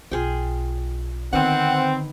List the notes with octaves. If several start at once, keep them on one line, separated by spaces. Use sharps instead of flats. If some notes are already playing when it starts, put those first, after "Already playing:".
B1 F4 G#4 G5
D3 D#3 B3 C4 F#5